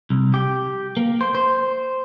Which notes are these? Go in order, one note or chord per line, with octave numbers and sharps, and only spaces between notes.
C2
G4
A#3
C5
C5